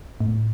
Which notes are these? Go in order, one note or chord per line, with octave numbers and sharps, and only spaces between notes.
A2